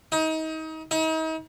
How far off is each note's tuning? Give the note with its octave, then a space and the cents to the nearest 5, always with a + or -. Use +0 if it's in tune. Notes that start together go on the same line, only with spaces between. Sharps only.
D#4 +30
D#4 +40